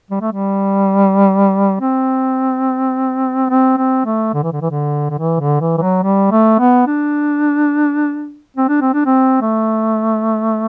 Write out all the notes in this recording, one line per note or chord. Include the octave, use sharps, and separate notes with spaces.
G3
A3
G3
C4
C4
C4
A3
D3
E3
D3
E3
D3
D3
E3
D3
E3
E3
F#3
G3
A3
B3
D4
C4
D4
C4
D4
C4
A3